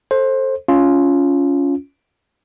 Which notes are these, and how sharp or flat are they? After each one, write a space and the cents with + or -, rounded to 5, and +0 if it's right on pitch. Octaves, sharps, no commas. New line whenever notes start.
A4 +0 C5 +20
C#4 +15 F4 +0